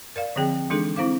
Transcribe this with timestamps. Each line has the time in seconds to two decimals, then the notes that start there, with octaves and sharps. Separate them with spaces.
0.16 A#4 D5 F5
0.36 D3 F3 C4 G#4 G5
0.70 E3 G#3 D4 D#4 G#4 A4
0.96 C4 E4 C5 F5 D6